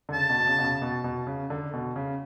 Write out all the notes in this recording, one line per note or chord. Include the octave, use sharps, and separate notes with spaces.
D3
C#3 A5
B2
B2
C#3
B2
C#3
B2
B2
C#3
D3
B2
C#3